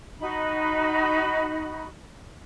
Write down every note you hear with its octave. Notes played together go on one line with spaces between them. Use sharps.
D#4 F#4 B5